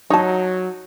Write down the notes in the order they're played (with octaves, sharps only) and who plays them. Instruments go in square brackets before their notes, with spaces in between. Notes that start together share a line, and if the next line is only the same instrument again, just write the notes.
[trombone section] F#3 [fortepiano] D#4 [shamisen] C#5 A5